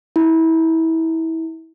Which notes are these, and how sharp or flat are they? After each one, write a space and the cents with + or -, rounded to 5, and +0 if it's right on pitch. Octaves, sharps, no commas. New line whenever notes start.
E4 -25